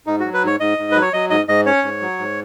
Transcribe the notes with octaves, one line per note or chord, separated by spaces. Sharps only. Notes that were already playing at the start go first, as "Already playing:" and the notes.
G#2 D#4
F#3 F#4
B4
G#2 C#5
G#2 D#5
G#2
F#3 B4
C#5
F#3 D#5
G#2 D#5
G#2 D#5
C#4 C#5
G#2
F#3
G#2